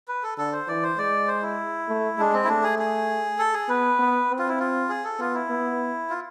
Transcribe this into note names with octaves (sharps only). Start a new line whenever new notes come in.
B4
A4
D3 A4
C5
E3 D5
C5
G#3 D5
C5
E4
A3
G#3 D4
C4
E4
A3 D4
G#4
G#4
A4
G#4
B3 B4
B3
C4
F4
E4
F4
G#4
A4
B3 F4
E4
B3
F4